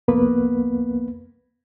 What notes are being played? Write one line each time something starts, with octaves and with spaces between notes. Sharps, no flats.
C2 F2 A#3 B3 B4